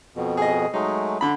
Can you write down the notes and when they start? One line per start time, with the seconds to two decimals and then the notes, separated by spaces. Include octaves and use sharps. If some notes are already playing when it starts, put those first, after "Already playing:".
0.16 F2 B2
0.37 G#4 D#5
0.74 F#3 G#3 A3 D#4
1.21 D3 B5